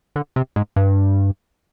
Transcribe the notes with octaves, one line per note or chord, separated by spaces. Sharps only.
D3
C3
G#2
G2